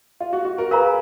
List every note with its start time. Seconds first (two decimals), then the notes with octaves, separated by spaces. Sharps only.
0.20 F4
0.33 F#4
0.45 F#4
0.58 F#4 A#4
0.71 G#4 A#4 B4 F5 A#5